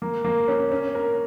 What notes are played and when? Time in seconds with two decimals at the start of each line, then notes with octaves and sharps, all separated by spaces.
0.02 A#3
0.25 A#3
0.48 C#4
0.72 C#4
0.95 A#4